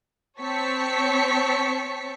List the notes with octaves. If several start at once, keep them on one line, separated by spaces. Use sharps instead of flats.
C4 C#5 A5 C#6 B6 C#7